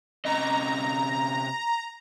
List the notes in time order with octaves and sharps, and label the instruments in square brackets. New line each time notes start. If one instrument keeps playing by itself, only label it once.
[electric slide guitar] C3 C#4 D#5 [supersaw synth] A#5